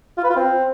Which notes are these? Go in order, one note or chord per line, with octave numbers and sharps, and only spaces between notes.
F4
B4
F4
C4